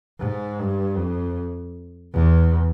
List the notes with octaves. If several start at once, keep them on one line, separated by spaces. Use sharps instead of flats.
G#2
G2
F2
E2